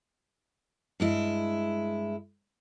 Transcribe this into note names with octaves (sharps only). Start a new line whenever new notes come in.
G2 G#3 E4